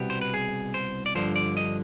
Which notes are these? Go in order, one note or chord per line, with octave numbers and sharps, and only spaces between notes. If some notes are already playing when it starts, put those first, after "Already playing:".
Already playing: C2 B2 B3 G4
C5
B4
G#4
C5
D5
G2 D3 F3 C5
D5
D#5